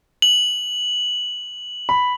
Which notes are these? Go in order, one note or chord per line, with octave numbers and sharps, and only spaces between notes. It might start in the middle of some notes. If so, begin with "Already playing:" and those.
F#7
B5